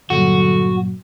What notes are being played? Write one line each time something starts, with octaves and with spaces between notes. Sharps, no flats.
G2 A#2 D3 F#3 F#4